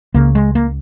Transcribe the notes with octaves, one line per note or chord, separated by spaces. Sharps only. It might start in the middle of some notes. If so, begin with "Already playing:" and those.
C#2 C#3 A#3
G#3
A#3